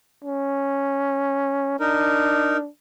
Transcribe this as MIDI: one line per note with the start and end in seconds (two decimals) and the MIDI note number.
0.24 1.77 61
1.80 2.68 62
1.80 2.57 63
1.80 2.57 70